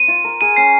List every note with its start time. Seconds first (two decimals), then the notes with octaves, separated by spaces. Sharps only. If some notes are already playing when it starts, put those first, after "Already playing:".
Already playing: C4 D#7
0.08 F4
0.24 A#4
0.41 G#4 D#7
0.56 C#4 C7